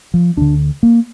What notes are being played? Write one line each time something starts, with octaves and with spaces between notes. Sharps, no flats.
F3
D2 D3 D4
A#3